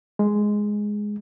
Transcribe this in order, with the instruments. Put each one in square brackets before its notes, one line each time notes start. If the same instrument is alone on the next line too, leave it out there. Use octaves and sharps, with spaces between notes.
[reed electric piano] G#3